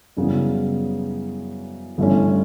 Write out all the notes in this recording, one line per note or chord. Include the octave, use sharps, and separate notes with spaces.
F#2 C#3 E3 G3 B3
G1 G2 E3 A3 C#4